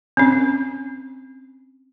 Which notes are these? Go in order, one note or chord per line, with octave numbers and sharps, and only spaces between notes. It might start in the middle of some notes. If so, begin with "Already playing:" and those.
C4 C#4